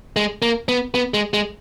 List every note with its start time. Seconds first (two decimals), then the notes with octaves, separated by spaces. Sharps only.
0.16 G#3
0.42 A#3
0.68 B3
0.95 B3
1.14 G#3
1.34 G#3